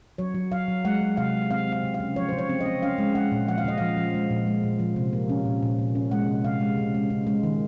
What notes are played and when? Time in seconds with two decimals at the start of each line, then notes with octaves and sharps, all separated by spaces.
0.18 F#3 C#5
0.35 F#3
0.52 F#3 F5
0.68 F#3
0.85 G#3 F#5
1.02 G#3
1.17 C3 F5
1.34 G#3
1.51 C4 F5
1.67 C4
1.73 F5
1.84 C#3
1.94 F5
2.00 C#3
2.16 F3 C#5
2.29 C#3 C5
2.38 C#5
2.49 C4
2.61 D#5
2.66 C4
2.82 C#4 F5
2.98 G#3
3.15 G#3 F#5
3.32 A#2
3.48 F3 F#5
3.58 F5
3.64 C#3 D#5
3.78 F3 F5
3.97 F3
4.14 G#3
4.30 A#2
4.47 G#3
4.63 A#2
4.79 F3
4.96 C3
5.13 A#3
5.29 C#4
5.45 A#2
5.63 A#2
5.79 A#2
5.95 C#4
6.11 G#3 F#5
6.28 C3
6.44 C3 F5
6.61 G#3
6.77 C#3
6.94 G#3
7.10 C#3
7.27 G#3
7.43 D#3